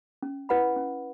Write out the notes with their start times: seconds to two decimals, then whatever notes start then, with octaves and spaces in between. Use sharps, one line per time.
0.22 C#4
0.49 E4 B4 F#5 B5
0.76 C#4